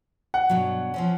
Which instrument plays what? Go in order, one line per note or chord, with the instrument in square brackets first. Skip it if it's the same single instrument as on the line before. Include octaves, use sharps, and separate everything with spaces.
[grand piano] F#5
[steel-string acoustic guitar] G2 B2 F#3
F3 C4 C#4